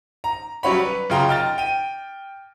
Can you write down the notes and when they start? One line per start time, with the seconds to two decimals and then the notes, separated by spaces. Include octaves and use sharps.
0.24 A#5
0.63 F#3 G3 C#4 C#5 F#5 B5
0.85 B4
1.10 F#2 C#3 F4 G5 A#5 C6
1.28 D#5 G5 F6 A6
1.58 G5 D#7